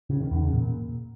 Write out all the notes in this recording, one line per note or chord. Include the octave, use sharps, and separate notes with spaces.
C#3
D#3
E2
C#3
A#2